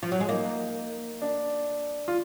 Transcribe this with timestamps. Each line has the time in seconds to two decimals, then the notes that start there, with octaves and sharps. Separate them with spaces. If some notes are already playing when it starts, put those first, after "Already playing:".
0.03 F3
0.12 F#3
0.20 G#3
0.29 A#3 D#4
1.22 D4
2.08 F4